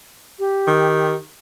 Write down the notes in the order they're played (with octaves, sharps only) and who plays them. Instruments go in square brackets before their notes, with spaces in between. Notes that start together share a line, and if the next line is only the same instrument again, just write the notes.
[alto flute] G4
[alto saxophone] D#3